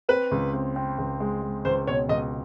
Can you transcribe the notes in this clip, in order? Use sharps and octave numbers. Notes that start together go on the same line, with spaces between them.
C4 B4
C#2
C4
C4
C#2
G#3
G#3
C#2 C5
B2 C#5
C#2 D#5